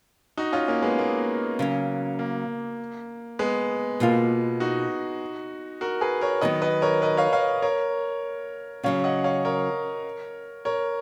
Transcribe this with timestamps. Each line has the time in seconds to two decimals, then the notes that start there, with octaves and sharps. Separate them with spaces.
0.37 D#4 F#4
0.53 C#4 F4
0.68 A#3 C#4
0.82 G#3 B3
0.99 A#3
1.59 C#3 F#3 C#4
2.19 A#3
3.39 G#3 B3
4.00 B2 A#3 F4
4.60 D#4 F#4
5.81 F#4 A#4
6.01 G#4 B4
6.21 A#4 C#5
6.41 D#3 F#3 B3 B4 D#5
6.62 B4 D#5
6.82 A#4 C#5
7.02 B4 D#5
7.17 C#5 F5
7.33 C#5 F5
7.62 A#4 C#5
8.83 C#3 F#3 C#4 C#5 F5
9.04 D#5 F#5
9.24 C#5 F5
9.45 A#4 C#5
10.65 A#4 C#5